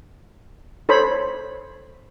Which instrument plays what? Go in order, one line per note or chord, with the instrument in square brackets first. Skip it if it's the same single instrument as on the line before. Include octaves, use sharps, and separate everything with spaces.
[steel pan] A4 C5 C#5 B5